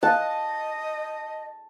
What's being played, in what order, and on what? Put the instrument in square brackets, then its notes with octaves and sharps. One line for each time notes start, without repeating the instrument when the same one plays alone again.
[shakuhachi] D#5 [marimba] F5 F#6 [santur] A5